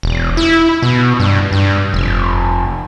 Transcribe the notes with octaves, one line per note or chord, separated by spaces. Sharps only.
E1
E4
B2
G2
G2
F1